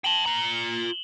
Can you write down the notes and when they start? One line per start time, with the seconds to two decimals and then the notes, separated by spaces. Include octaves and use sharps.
0.04 G5 A5 E7 F#7 G7
0.26 F4 A#5